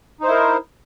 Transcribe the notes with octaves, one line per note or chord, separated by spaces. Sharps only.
D#4 E4 A#4 C5